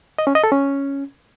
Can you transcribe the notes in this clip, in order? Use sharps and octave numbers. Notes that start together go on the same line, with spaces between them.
D#5
C#4
D#5
A4
C#4